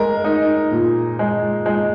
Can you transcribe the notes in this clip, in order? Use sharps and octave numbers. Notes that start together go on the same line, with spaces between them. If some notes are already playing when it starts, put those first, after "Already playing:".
Already playing: G#3 A#4
D#4
A#2
G#3
G#3